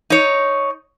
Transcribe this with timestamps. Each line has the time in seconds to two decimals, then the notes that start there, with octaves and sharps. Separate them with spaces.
0.10 D#4 C#5